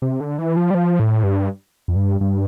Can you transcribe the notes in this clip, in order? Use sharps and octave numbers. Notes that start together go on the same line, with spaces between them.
C3
D3
E3
F3
G3
F3
A2
G2
F2
G2
G2